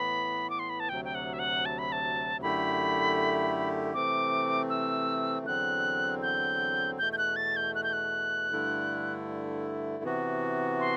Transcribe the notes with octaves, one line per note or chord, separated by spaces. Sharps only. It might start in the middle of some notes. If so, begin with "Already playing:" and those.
Already playing: A2 E3 B3 B5
D6
C6
B5
A5
D2 C3 F#3 G5
G5
F#5
E5
F#5
A5
B5
A5
F#2 D3 A3 E4 G4 B5
C3 E3 A3 C4 D6
E6
E2 D3 F#3 C4 F#6
G6
E2 B2 A3 G6
G6
F#6
A6
G6
F#6
G6
F#6
G2 D3 A3 E4
C3 E3 B3 F#4
C6